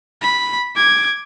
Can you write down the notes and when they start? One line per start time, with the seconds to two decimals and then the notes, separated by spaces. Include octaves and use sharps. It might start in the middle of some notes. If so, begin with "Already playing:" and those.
0.22 B5
0.76 D6 G#6